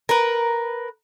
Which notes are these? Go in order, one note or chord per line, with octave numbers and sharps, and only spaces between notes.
A#4 B4